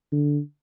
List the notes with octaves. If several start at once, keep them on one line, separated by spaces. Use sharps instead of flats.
D3